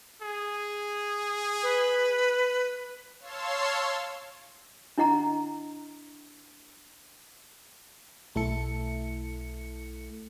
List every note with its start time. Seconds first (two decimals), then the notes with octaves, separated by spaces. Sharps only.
0.22 G#4
1.63 B4
3.20 C#5 F5 A5 C6 E6
4.98 D4 E4 D#5 F#5 A#5
8.35 B1 A3 E4 A4 C#7